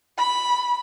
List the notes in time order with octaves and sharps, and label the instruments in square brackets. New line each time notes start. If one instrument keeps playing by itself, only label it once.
[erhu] B5